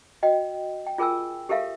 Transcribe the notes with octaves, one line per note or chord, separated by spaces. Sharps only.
F#4 D#5 G5
G5
F4 G#4 A#4 G5 G#5 E6
G4 A4 A#4 E5 F5